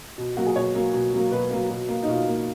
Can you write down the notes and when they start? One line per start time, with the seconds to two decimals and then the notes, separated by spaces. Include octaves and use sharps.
0.18 B2
0.37 F#3 A#3 F#4
0.46 G#4
0.56 B2 C#5
0.75 F#3 A#3
0.93 B2
1.13 F#3 A#3
1.32 B2 B4
1.51 F#3 A#3
1.69 B2
1.89 A#3
2.03 D#4
2.08 B2 F4
2.27 A#3